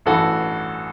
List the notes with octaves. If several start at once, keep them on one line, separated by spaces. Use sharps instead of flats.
A1 G2 E3 F#4 A4